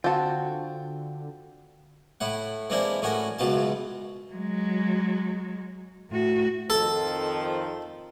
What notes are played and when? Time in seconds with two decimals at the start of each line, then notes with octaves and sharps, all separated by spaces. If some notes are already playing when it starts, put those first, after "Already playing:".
0.04 D3 C4 F4 F#4 A5
2.20 A2 E4 F#5
2.70 E3 G#3 A#3 C4 D4 E4
3.02 A2 C#4 F#4 A#4
3.39 C#2 F#2 B2 F4 A5
4.33 F#3 G#3
6.10 A2 F#4
6.70 F2 D#3 F3 A4